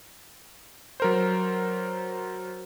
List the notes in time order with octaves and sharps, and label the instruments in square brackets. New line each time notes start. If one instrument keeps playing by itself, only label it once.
[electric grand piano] F#3 A#4 C5